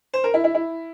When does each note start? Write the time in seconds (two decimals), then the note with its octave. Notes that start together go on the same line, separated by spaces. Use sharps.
0.13 C5
0.24 A#4
0.34 E4
0.44 E4
0.55 E4